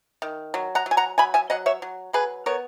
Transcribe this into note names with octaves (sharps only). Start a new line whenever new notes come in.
D#3
F#3
F#5 A#5
F#3
G#5
F#5 A#5
F#3 G#5 B5
E5 G#5
F#3 D#5 F#5
C#5 E5
F#3
F#3 G#4 B4
B3 A#4 C#5